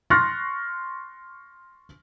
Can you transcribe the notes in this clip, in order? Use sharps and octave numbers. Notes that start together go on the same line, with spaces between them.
C6 C#6 F6 F#6 A6 A#6